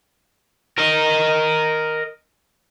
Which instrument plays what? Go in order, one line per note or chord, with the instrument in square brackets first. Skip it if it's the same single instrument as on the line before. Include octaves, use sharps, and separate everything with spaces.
[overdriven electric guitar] A#4 D#5